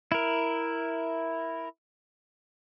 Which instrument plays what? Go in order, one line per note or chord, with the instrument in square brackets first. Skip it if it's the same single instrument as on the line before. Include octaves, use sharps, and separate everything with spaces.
[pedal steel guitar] E4 A#4